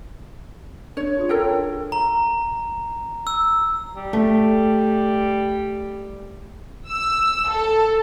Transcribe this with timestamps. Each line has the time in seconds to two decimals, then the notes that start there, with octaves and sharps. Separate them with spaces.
0.97 D4 C#5
1.17 D4 F4 G#4
1.29 F4 A4 A#4 C#5 G5
1.92 A#5
3.27 E6
3.95 G3
4.13 A3
6.89 E6
7.49 A4